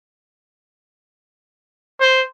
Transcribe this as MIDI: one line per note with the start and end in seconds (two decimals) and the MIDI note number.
2.00 2.22 72